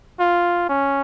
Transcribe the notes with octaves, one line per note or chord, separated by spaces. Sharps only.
F4
C#4